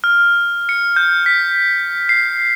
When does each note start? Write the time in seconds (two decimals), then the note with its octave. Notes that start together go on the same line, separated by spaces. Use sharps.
0.04 F6
0.69 C#7
0.96 G6
1.26 B6
2.09 C7